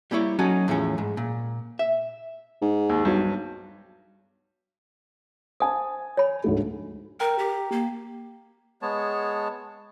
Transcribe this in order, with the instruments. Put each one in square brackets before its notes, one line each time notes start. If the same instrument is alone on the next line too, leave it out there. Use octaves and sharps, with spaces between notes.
[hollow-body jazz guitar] G3 A#3 E4 C#5 D5
F#3 C#4 D#4 F#4 A4
E2 A2 F3 C#4
G#2
A#2
E5
[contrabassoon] G#2
[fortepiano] D#2
[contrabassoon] B1 [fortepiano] G2 F#3
[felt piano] C5 G#5 A5 [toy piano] D#6
[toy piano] C#5 B5
[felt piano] D2 G#2 A3
[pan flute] A#4 [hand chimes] G5 A#5
[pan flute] G4
A#3
[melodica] G#3 B3 C#5 A5